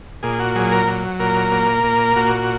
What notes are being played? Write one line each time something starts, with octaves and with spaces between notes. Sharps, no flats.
A#2 G#4
F#4
F#3 G#4
A#4
F#3
A#2 A#4
A#3
A#2
A#2 F#4